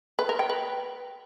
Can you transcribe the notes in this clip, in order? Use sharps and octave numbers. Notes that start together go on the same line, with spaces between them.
B4
A#4
G5
B4